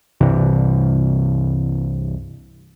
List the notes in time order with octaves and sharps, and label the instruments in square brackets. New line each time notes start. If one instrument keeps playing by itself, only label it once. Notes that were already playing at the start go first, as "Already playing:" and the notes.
[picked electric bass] C2 G2 C3 E3